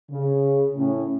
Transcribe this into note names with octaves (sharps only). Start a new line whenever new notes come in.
C#3
A2 C#4